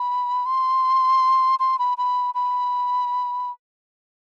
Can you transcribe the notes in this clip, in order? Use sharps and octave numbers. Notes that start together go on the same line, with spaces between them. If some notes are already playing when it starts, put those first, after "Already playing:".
Already playing: B5
C6
C6
B5
B5
B5